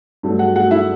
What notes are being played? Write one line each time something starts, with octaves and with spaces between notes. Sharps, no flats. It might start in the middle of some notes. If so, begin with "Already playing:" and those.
G2 F#3 A3
F#4 F#5
F#4 F#5
E4 E5